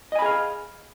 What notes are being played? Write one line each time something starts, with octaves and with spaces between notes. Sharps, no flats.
G#4 D#5 F5 G#5 B5